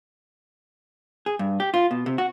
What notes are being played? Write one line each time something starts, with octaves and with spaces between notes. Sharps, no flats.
G#4
G2
G4
F4
B2
C3
F#4